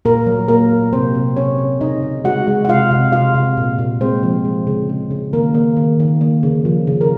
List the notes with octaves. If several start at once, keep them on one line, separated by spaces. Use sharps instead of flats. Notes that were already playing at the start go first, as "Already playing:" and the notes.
A#2 A#3 A#4
F#3
A#2 A#3 A#4
A#2
C3 C4 C5
C3
C3 C#4 C#5
C3
C#3 D#4 D#5
C#3
G#3 F#4 F#5
G#3
F#5
C3 F4 F5
C3
C3 F4 F5
C3
A#2
A#2
G#3 C4 C5
F3
G#3
C#3
C#3
C#3
D#3 A#3 A#4
A#3
D#3
D#3
A#3
C#3
F3
C#3
A#4